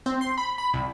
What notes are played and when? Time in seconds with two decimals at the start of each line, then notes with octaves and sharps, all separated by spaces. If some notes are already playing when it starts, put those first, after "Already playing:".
0.06 C4
0.21 C6
0.38 B5
0.58 B5
0.74 C2